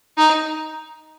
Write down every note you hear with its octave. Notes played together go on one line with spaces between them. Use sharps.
D#4